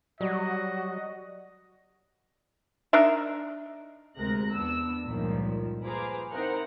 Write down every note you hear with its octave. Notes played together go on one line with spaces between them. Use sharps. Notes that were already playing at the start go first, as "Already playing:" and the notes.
F#3 G3 F#4 D#5
D4 D#4 A#4 E5
D2 C3 G#3 A#4 F#6 A#6
E2 B3 D4 E6
C#2 G2 A#2 D#3 F3
F4 G#4 B4 C5 A#5 D6
C4 D#4 E4 A#4 C5 F#5